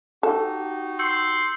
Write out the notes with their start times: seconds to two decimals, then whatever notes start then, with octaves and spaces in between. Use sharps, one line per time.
0.23 D#4 F#4 G4 A4
0.99 C6 E6 G6 C#7